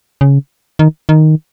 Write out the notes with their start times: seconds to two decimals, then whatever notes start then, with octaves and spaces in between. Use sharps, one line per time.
0.21 C#3
0.79 D#3
1.09 D#3